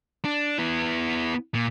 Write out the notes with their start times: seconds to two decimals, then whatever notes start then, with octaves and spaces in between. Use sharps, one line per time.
0.25 D4
0.59 B3 E4
1.55 A#2